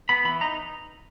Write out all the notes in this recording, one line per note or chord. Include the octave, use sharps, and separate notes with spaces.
B3 B5
E3 B5
D#4 A#5